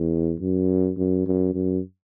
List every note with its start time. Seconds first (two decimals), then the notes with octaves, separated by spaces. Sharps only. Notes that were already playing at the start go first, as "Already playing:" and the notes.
Already playing: E2
0.40 F#2
0.97 F#2
1.26 F#2
1.54 F#2